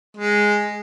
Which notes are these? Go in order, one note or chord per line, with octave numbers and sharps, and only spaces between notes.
G#3